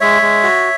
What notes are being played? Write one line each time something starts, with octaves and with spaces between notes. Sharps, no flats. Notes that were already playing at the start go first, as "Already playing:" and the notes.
G#3 C#5 E5
G#3
F#4